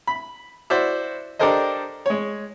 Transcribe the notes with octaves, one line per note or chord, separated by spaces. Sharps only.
B5
E4 F#4 C5 D5 E5
D4 G4 A4 A#4 C5 D#5
G#3 C#5